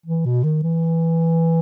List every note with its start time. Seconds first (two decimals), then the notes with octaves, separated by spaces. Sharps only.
0.06 E3
0.25 B2
0.44 D#3
0.63 E3